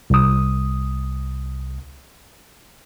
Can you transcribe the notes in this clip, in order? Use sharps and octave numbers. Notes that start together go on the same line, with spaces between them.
C2 D#6